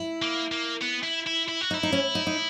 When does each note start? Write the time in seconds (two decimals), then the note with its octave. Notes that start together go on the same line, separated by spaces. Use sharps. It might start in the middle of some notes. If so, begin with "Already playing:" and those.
Already playing: E4
0.22 A#3
0.52 A#3
0.81 B3
1.03 E4
1.26 E4
1.48 E4
1.61 F#4
1.71 D#4
1.74 E4
1.83 D#4
1.93 C#4
2.15 D#4
2.27 D#4